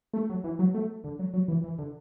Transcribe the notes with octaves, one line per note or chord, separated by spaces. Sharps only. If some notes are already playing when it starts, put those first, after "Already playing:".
A3
F#3
E3
F#3
A3
D3
F#3
F#3
E3
E3
D3